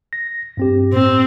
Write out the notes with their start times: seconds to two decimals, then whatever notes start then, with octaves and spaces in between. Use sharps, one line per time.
0.13 A#6
0.57 G2 C4 G4
0.93 A2 C4